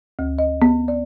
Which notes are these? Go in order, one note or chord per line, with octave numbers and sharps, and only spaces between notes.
D2
D#5
B3
D5